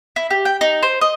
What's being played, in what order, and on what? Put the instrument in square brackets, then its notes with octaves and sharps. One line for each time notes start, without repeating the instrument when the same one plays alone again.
[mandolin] E4
G4
G5
D#4
C5
D#5